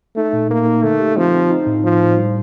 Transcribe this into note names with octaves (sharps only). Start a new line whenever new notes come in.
A3 D#4
A#2
A#2 A#3
D#4
D3 A3
G4
F3 C4
C4
D#4
A2
A2 F3
A2
G3